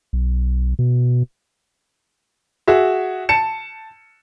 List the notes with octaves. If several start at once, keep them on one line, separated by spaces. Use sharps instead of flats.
B1
B2
F#4 G#4 E5
A5 C#7 E7